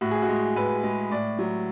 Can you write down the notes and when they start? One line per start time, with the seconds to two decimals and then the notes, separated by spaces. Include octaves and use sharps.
0.01 A2 F#4
0.11 G#4
0.22 F#4
0.28 G#3
0.56 A2 B4
0.84 G#3
1.11 A2 D5
1.39 F#3